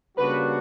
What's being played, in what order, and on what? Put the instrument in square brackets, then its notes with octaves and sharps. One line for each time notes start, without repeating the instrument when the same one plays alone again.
[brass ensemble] C#3 G3 A#3 D4 F#4 [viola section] B4